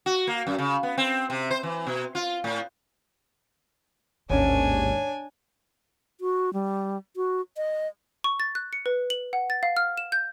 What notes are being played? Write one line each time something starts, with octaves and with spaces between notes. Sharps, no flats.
F#4
A#3
F#2
C#3
B3
C4
C3
C5
E3
B2
F4
A2
A1 D#2 G#2 C#4 D4 C#5 G#5
F#4
G3
F#4
D#5
C#6
A6
F#6
C#7
B4
F#7
F#5
A6
F5
F6
E7
G6